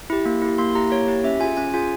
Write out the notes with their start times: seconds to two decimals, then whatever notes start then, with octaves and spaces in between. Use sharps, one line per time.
0.10 E4 G4
0.26 A#3
0.42 E4 G4
0.58 A#3 C6
0.75 E4 G4 A#5
0.91 A#3 C#5
1.08 E4 G4
1.24 C#4 E5
1.40 F4 G#5
1.45 G#4
1.57 C#4 G#5
1.74 F4 G#4 G#5